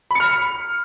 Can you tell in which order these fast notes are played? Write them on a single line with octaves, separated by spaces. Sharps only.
B5 C#7 F6